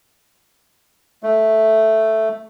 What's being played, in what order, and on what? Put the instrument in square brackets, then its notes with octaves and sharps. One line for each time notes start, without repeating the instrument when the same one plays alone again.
[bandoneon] A3